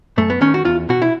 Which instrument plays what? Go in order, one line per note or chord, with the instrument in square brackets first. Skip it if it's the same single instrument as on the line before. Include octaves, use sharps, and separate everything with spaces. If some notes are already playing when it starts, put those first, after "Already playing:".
[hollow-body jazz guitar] F#2 A3
B3
D#3 C#4
F#4
E2 F4
B2 F#4
E4